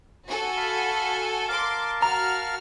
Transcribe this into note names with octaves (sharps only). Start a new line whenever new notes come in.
F#4 A4 G#5
F5 A5 B5
A#4 F5 A5 C6 D6
F#4 A#5 F6